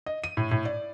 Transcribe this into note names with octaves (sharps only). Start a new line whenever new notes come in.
D#5
D#7
A2
A2
D5